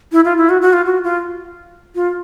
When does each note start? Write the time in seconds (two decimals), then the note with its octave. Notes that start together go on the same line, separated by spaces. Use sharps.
0.12 E4
0.25 F4
0.38 E4
0.49 F#4
0.62 F#4
0.73 F4
0.86 F#4
1.04 F4
1.95 F4